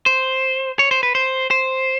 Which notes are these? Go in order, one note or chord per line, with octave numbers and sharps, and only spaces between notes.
C5
C#5
C5
B4
C5
C5